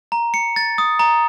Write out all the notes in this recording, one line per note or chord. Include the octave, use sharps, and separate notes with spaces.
A#5
C#7
A6
D#6
A#5